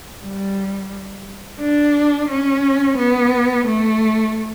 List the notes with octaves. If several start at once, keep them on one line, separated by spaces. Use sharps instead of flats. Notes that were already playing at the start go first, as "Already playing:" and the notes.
G3
D4
C#4
B3
A3